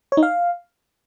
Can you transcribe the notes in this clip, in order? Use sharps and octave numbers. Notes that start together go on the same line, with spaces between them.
C#5
D#4
F5